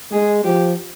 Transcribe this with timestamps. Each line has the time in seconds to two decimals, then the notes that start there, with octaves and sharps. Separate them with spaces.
0.12 G#3 G#4
0.44 F3 G4